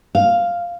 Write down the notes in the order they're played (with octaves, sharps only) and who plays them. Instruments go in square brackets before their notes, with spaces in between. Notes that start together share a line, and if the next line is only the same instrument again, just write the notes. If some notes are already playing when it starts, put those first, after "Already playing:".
[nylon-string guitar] F5